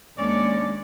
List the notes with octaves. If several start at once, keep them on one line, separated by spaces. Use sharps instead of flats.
D#2 G#3 C#4 D4 C#5 D5